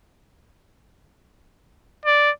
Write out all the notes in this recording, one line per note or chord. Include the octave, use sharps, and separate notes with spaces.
D5